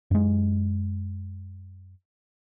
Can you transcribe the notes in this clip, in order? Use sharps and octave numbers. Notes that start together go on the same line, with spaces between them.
F#2 G#3